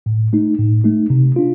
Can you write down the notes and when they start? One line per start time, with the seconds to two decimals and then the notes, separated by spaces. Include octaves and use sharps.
0.06 A2
0.33 A3 D#4
0.59 A2
0.84 A3 D#4
1.10 C3
1.36 D4 F4